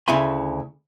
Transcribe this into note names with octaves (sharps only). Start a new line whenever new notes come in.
D2 C#3 E4 E5 G#5 C6